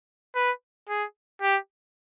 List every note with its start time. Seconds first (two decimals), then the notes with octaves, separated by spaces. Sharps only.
0.35 B4
0.88 G#4
1.42 G4